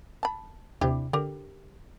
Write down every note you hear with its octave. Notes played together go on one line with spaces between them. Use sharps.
A5 B5
D#2 C3 D4 E4 G4
D3 G4 A#4